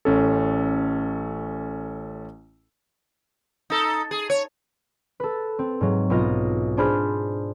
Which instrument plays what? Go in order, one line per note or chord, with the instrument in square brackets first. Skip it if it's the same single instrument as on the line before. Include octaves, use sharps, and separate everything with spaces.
[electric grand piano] A1 C#4 A4
[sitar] D#4 A4
G#4
C#5
[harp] A4 B4
C4
G#2 F#3
B1 B3 F4 D#5 A#6
D4 G#4 C5 B5 F6